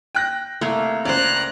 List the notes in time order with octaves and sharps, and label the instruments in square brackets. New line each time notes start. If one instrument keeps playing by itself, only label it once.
[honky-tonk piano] G5 F#6 A#6
[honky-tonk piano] C2 [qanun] A3 A#3
[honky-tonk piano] C#2 [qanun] C5 D5 [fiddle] A#5 F#6